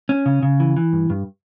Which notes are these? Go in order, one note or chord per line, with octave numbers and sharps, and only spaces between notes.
C#4
C#3
C#3
E3
E3
G2
G2